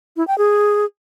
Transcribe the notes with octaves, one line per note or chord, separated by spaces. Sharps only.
E4
G5
G#4